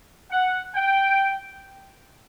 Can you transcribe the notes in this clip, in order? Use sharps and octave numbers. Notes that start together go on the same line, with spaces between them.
F#5
G5